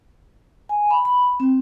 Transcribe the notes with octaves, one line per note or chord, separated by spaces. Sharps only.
G#5
B5
B5
C4